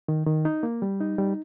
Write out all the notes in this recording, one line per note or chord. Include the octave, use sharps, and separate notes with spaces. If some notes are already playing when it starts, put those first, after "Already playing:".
D#3
D#3
D#4
A#3
G3
D#4
G3